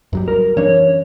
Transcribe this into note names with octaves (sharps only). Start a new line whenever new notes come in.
F#2 F#3 G3
A#4
E3 C#4 D4 C#5